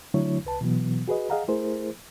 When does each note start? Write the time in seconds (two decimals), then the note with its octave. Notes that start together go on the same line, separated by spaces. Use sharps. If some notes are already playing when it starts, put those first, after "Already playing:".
0.14 D3 F#3 A3 D4 E4 C#5
0.45 C2 B4 A5
0.61 B2 E3 F#3 B3
1.08 F#4 G#4 B4 D#5
1.30 G#4 D#5 F5 F#5 A#5
1.48 A3 E4 G#4 A#4 C5